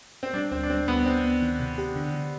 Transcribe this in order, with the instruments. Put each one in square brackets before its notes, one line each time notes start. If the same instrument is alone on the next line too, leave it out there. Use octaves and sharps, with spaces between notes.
[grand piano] C4
[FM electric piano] G3 [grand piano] D4
[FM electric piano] D2 [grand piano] C4
[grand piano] D4
[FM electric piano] G3 [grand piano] C4
[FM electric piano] D2 [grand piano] B3
[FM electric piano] B3 [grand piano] C4
[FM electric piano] B3
D#3
C3
G4
D3
D3